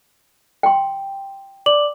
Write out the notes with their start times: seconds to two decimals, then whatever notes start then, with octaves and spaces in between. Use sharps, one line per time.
0.63 G5 C6
1.66 D5 D6 F#7